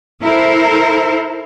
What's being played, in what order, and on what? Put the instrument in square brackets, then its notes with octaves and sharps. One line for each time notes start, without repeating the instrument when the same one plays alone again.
[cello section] E4 A4 A#4 C5